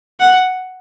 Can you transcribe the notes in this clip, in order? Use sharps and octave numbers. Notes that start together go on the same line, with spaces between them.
F#5